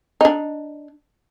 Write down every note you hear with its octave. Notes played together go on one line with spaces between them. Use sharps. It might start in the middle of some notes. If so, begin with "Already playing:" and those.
D4 D#4